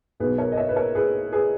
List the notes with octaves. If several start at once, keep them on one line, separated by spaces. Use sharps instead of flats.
B1 B2 F#3 G#4 B4
A#4 C#5
D#5
C#5 E5
B4
A#4 C#5
G#4 B4
G#4 B4